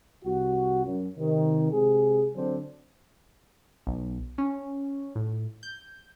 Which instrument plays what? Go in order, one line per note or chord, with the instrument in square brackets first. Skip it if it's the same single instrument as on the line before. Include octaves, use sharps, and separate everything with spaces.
[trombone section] C2 F#4
F#2
C3 D#3
C3 G#3 G#4
D3 F#3 C4 D4 C5
[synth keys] B1
C#4
A2
G6